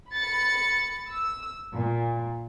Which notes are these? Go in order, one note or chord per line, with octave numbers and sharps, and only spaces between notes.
B5 A6 C#7
E6
A#2